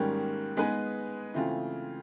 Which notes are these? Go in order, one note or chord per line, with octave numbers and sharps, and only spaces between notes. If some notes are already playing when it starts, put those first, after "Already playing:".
Already playing: G#2 D#3 G3 A#3 C#4
G#3 B3 D#4 G#4 B4
C#3 E3 A3 C4 F4